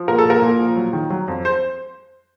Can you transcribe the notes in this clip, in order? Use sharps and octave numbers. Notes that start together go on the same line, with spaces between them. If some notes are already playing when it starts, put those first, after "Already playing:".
Already playing: F3
A#2 A#4
A4
A#2 A#4
A#2
F3
F#3
D#3
F#3
F2
C5